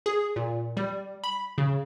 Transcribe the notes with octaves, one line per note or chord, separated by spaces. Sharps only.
G#4
A#2
G3
B5
C#3